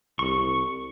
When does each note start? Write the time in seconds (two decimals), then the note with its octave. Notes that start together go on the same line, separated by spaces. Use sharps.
0.19 C2 C#6